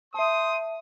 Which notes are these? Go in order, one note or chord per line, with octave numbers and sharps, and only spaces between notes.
C5 E5 A5 C6 D#6